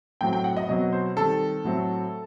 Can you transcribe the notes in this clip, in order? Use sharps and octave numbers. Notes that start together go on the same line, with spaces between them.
A2 F#3 C4 G5
G5
F#5
D#5
B2 F#3 C4 D#5
C5
D#3 G3 C4 A4
A2 F#3 A3 C4